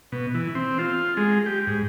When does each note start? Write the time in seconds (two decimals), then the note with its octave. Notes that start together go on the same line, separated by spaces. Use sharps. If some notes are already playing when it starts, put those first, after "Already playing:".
0.12 B2
0.34 E3
0.55 C4
0.79 F4
1.17 G#3
1.46 G4
1.67 G#2